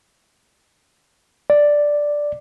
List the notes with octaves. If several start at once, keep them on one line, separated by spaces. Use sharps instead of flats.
D5